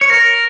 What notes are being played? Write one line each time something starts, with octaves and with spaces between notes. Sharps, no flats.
C#5
A#4